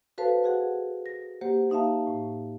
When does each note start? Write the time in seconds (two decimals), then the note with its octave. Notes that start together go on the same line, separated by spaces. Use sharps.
0.18 F#4 A4 B4 C5 F5 A5
0.44 F#4 G#4 F#5
1.06 A#6
1.41 A#3 G4 C5 F#5
1.70 A#3 D#4 E5 F5 A5
2.07 A2